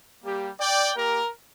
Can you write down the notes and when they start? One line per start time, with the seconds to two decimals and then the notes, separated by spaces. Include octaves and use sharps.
0.23 G3 A#3 G4
0.59 D5 G5
0.95 A#3 G4 A#4